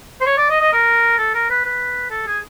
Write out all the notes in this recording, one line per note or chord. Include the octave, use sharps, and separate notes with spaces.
C5
C#5
D5
D#5
D#5
A#4
A4
A#4
B4
B4
A4
G#4